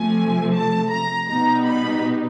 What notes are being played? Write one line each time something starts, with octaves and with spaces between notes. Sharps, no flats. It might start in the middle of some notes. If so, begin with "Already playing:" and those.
Already playing: C3 F3 A3 G#5
A5
A#5
B2 G3 B3 D#4 A#5
B5